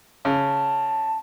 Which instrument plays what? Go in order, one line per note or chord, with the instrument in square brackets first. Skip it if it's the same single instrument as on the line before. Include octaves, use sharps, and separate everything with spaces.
[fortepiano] C#3 [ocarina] A5